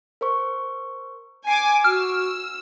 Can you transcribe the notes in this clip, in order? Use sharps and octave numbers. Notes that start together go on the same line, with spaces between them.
A#4 C5 C#6
G#5 D6 C7 D7
F#4 E6 F6